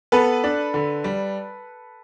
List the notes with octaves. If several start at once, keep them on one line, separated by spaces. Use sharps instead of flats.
B3 A4 B4
D4
D3
G3